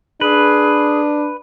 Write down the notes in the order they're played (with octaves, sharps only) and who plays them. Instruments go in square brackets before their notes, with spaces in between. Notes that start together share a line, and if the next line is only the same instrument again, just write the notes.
[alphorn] D4 [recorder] G#4 [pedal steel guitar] B4